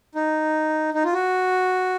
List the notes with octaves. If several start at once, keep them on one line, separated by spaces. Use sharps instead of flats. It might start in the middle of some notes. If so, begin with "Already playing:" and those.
D#4
D#4
F4
F#4